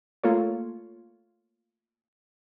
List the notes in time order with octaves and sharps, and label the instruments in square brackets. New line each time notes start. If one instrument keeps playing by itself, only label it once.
[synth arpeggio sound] A3 A#3 F4 A4 C#5